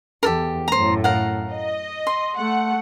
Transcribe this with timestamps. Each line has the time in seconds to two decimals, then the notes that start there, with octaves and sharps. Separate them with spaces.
0.23 E2 G4 A4 A#4
0.68 F#2 A2 C5 A#5
1.04 A#4 F5 F#5
1.51 D#5
2.07 C6
2.36 A3 F#5